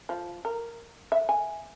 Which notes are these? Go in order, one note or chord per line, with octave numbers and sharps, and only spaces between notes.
F3
A#4
E5
G#5